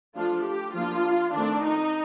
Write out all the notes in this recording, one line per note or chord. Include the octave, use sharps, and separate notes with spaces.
F3 A3 D4 F4
G4
F3 A#3 D4 F4
D#3 A3 C4 D4
D#4